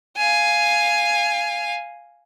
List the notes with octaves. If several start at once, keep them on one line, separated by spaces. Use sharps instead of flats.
F5 G#5